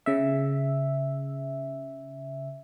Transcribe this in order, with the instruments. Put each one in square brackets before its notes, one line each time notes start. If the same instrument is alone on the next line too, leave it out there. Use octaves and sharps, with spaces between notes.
[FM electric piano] C#3 E5